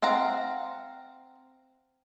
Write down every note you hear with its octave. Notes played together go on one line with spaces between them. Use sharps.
C4 F5 F#5 A#5